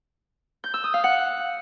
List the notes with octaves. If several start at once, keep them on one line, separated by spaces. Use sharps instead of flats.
G6
E6
D#6
F5
F#5